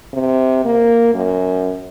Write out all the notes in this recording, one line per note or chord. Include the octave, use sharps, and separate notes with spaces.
C3
A#3
F#2